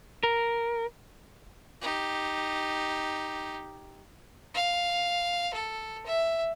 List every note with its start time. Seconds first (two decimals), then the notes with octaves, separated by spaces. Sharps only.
0.23 A#4
1.81 D#4 G4
4.54 F5
5.54 A4
6.06 E5